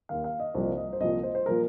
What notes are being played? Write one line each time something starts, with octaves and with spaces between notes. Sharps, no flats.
D#2 D#3 F5
F5
D#5
C2 A#2 F3 C5
D#5
C5
C2 A#2 F3 D#5
C5
C5
A#2 F3 A#4